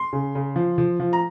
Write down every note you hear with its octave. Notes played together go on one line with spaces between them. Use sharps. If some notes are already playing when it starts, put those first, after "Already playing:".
Already playing: C6
C#3
C#3
F3
F3
F3
A#5